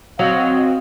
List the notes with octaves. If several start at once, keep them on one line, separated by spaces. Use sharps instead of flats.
F#3 C4 F#4 D#5 F5